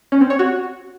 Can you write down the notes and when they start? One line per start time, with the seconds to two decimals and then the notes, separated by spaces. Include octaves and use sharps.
0.12 C#4
0.21 C4
0.30 C#5
0.39 F#4